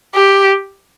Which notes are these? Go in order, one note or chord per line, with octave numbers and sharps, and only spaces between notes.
G4